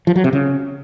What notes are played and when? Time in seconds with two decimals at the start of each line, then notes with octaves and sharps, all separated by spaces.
0.07 F3
0.16 F#3
0.24 C3
0.33 C#3